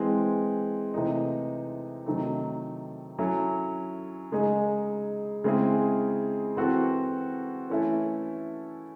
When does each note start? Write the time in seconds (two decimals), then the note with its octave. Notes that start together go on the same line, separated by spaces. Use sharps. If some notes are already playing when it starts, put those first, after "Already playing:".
Already playing: E3 G#3 C4
0.94 C3 E3 A3 D#4
2.06 C3 D#3 F#3 A3 D#4
3.19 F#3 C#4 E4 A4
4.32 C#3 G#3 D#4 G#4
5.44 C#3 G#3 C4 E4 G#4
6.57 E3 C4 F#4 A4
7.69 E3 A3 C#4 E4 A4